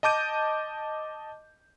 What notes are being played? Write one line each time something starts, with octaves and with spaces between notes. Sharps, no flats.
D#5 A5 D6 G6 D#7